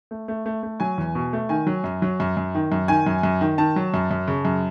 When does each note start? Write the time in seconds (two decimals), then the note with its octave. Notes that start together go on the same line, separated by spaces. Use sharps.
0.11 A3
0.28 A3
0.46 A3
0.63 A3
0.80 F#3 G#5
0.98 E2
1.15 B2
1.33 A3
1.49 D#3 G#5
1.67 F#3
1.84 F#2
2.02 F#3
2.20 F#2
2.37 F#2
2.55 D#3
2.72 F#2
2.88 D#3 G#5
3.06 F#2
3.23 F#2
3.41 D#3
3.58 D#3 A5
3.76 F#3
3.94 F#2
4.11 F#2
4.28 C#3
4.45 F#2